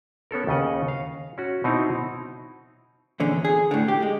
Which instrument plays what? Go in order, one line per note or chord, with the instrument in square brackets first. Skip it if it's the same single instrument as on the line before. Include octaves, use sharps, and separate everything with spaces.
[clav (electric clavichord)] B3 C#4 A4 A#4
D#2 C#3 D#5 F#5
F5
C#4 F#4
B2 C4 D#4 E4 A#5
[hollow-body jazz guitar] E2 A#2 D3 C#4
G#4
A2 D3
G4
G#3